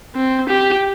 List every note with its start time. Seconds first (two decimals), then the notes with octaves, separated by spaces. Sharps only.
0.15 C4
0.49 G4